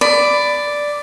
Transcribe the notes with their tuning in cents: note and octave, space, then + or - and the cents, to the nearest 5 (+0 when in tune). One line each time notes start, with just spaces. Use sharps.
D5 +0 B5 +15